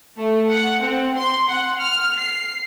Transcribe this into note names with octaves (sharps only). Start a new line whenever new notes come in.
A3
F#5
C4
C6
F#5
F6
C7